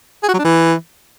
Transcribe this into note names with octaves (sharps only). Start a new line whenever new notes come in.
G#4
F#4
F#3
D4
E3